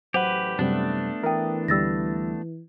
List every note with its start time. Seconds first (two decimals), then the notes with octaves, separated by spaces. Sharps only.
0.14 A1 F#3 G4 B4 C5 F#5
0.59 F#2 C3 G3 A3 B3 D4
1.23 E3 A#4 E5 G5 D#6
1.68 D2 G3 E6 A6 A#6